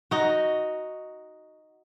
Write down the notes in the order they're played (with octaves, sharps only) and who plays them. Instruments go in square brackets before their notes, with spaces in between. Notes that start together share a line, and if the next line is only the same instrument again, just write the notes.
[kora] D#4 F#4